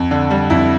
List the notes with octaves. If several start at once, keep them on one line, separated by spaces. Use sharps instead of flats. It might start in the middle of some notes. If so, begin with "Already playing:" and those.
Already playing: F2
D3
G3
F2 E4